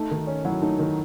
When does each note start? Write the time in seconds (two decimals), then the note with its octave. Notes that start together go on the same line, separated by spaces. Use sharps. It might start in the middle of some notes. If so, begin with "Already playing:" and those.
Already playing: A3 D#4
0.11 D#3
0.27 C#4
0.45 F#3 E4
0.62 A3 D#4
0.79 D#3 E4